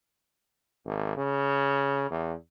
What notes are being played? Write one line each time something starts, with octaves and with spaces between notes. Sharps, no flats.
G#1
C#3
E2